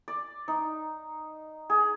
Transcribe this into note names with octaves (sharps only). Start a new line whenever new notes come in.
D5
D#4
G#4